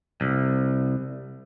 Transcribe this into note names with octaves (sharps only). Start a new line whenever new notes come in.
C2